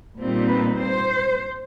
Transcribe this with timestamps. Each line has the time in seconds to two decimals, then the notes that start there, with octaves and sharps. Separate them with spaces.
0.18 A#2 G3 C4 D#4
0.48 B4
0.78 C5